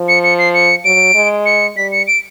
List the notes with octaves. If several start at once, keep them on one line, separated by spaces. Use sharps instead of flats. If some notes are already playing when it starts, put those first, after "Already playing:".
Already playing: F3
C#7
C#7
C7
C#7
F#3 D7
G#3
C#7
G3 B6
C#7
D7